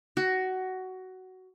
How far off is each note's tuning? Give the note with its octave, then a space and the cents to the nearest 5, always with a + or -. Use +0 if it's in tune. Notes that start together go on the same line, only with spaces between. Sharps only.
F#4 +15